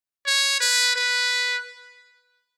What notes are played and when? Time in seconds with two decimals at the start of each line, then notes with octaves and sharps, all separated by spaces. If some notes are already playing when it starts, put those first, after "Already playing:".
0.26 C#5
0.60 B4
0.96 B4